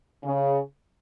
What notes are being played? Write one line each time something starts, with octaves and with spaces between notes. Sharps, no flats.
C#3